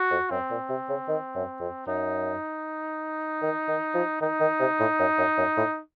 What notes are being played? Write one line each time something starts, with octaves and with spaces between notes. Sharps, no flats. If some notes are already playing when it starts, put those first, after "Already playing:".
Already playing: F#4
F2
F#2 C4
A#2
C3
C#3
D#3
F#2
F2
F#2 D#4
D#3
D#3
F3
D#3 D#4
D#3
C3
A2
F#2
F#2
F#2
A2